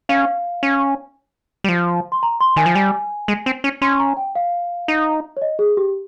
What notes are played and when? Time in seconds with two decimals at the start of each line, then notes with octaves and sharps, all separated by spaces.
0.09 C#4 F5
0.63 C#4
1.64 G3
1.69 F3
2.12 C6
2.23 A#5
2.40 C6
2.56 D#3 G#5
2.66 F3
2.75 G3 G#5
3.28 G#3
3.46 C4
3.64 C#4
3.82 C#4 C6
3.99 A#5
4.17 G5
4.36 F5
4.88 D#4
5.37 C#5
5.42 D#5
5.59 G#4
5.77 G4